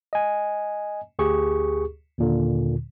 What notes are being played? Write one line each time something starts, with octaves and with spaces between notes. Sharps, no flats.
D#5 G#5
D2 G4 G#4 C#6
D#2 A#2 D3